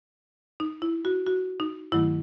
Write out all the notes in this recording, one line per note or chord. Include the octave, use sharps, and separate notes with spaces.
D#4
E4
F#4
F#4
D#4
G2 D#3 F#3 A3 E4